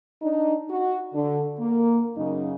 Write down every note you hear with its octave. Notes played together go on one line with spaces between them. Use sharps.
D4 D#4
F#4
D3
A#3
F#2 C#3 D#4